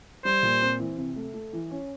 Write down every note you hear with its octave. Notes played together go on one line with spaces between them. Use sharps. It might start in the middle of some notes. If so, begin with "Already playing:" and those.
G3 C5
A#2
C4
E3
C3
A3
A3
E3
C#4